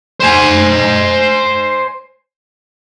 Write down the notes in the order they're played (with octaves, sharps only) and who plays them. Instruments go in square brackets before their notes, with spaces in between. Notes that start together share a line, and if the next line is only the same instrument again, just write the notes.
[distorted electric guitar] C5 G#5